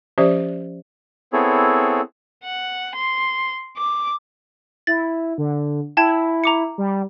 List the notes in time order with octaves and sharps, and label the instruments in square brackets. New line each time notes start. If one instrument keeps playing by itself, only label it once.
[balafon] F3 C#4 G4 C5 D5 E5
[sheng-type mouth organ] B3 C4 E4 G#4 A4 C#5
[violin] F#5
C6
D6
[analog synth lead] E4 [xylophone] A6
[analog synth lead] D3
[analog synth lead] E4 [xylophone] G5 A5 G#6
[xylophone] A#5 D6 C#7
[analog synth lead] G3